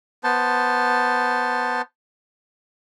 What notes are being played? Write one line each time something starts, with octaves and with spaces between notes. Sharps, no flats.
B3 C5 A5